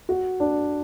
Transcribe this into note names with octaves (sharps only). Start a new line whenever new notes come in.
F#4
D4